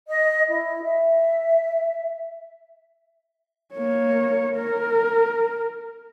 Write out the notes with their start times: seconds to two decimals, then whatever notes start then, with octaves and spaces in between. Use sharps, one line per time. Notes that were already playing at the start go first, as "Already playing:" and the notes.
0.08 D#5
0.48 E4
0.83 E5
3.74 A#3 C#5
4.55 A#4